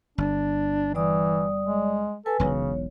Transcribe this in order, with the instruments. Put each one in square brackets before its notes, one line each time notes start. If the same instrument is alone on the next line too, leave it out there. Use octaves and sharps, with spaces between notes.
[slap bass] G1 [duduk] D4
[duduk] E3 [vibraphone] G3 D5 D#6
[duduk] G#3
[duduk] A4 [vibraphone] B4 G#5
[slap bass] E1 B1 [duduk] C#3 [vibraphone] C#5